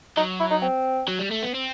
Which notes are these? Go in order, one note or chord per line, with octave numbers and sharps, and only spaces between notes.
F#3 D#4
E4
D#4
C4
F#3
G3
A3
B3
C4